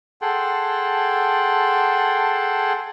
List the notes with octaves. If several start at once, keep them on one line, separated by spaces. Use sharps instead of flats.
G#4 A4 F#5 G5 A5 C6